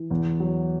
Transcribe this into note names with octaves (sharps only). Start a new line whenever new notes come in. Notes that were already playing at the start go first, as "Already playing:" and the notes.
Already playing: E3
E2
F#3